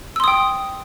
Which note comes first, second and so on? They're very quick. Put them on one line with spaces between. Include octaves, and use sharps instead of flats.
E6 C6 D#6 G5